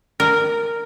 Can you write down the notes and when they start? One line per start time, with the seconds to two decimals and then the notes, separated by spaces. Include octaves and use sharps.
0.20 A#4